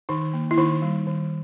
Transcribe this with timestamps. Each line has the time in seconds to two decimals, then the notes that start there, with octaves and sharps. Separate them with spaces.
0.09 D#3 D#4
0.33 A#3
0.51 E4
0.57 D#3 D#4
0.82 G3
1.07 D#3